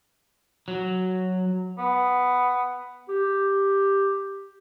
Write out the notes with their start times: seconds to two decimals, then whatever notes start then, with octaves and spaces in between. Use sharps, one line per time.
0.68 F#3
1.78 B3
3.09 G4